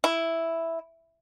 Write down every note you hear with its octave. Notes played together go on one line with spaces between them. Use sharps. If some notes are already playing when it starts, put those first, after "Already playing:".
E4